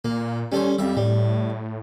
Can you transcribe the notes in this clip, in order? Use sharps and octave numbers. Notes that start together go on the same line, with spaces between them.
A#2 A#3
G3 C#4 A4 C5
F2 G3 E5
A2 G3